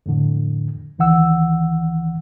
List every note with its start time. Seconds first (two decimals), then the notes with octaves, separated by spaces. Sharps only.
0.06 F2 A2 D3
0.98 C#2 D#3 E3 F#5 E6